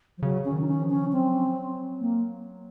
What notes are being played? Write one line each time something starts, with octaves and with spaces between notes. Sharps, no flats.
F3
C#3 F#3
C#4
D#3
D#4
C#4
F3
C#4
F#3 C4
A#3